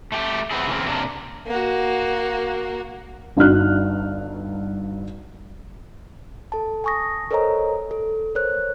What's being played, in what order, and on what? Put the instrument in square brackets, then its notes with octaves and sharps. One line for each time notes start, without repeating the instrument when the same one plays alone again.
[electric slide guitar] A3 G4
B3 C4 E4 G#4
C#3 E3 A#3 C4
C3 A#3 D4
[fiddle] A#3 F#4
[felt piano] G1 G2 D#4 F#4 F6 F#6
[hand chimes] A4 A5
G#5 A5 C#6 D#6 A#6
A4 A#4 C5 C#5 D#5 A#5
A4
A#4 C5 C#5 F#6